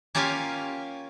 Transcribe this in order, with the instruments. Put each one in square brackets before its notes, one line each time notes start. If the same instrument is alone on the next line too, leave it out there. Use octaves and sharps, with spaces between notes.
[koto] A#3 C#4 F4 G4 F5 G#5